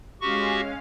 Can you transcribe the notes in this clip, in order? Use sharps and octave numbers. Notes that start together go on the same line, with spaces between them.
G#3 C#4 F#4 G4 F5 C#6